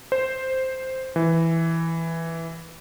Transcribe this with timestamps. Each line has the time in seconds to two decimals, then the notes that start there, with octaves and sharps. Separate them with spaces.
0.12 C5
1.16 E3